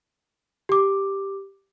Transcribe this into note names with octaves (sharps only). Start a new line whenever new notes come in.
G4 D6